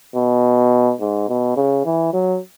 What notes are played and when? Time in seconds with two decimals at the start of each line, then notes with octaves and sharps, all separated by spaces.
0.16 B2
1.00 G#2
1.28 B2
1.57 C#3
1.85 E3
2.13 F#3